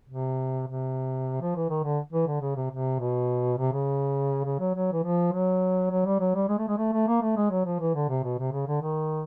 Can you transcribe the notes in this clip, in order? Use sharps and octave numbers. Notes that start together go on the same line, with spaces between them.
C3
C3
F3
E3
D#3
D3
E3
D3
C#3
C3
C3
B2
C3
C#3
C#3
F#3
F#3
E3
F3
F#3
F#3
G3
F#3
G3
G#3
A3
G#3
A3
A3
A#3
A3
G#3
F#3
F3
E3
D3
C3
B2
C3
C#3
D3
D#3